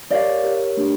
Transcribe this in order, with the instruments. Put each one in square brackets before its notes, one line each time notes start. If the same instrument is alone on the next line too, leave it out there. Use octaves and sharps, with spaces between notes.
[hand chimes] G4 A#4 C#5 [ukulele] D5 F5
[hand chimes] G4 A#4 C#5
A3 D4 G4